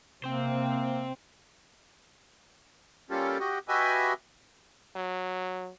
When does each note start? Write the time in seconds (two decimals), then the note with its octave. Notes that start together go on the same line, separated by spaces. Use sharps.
0.24 C3 A#3 C4 C5
3.10 G3 A#3 C#4 F4 G4 A4
3.40 F#4 G4 D#5
3.68 F#4 G4 B4 D#5 E5 G#5
4.95 F#3